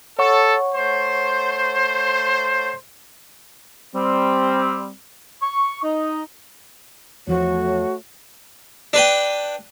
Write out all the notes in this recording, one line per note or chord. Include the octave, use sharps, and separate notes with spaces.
A4 C#5 F#5 C#6
A3 C5
G3 C4
C#6
D#4
E2 F3 A3 F#4 C#5
D4 B4 G5